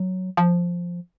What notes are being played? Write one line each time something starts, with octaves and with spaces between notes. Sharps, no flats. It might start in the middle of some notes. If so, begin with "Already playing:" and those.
Already playing: F#3
F3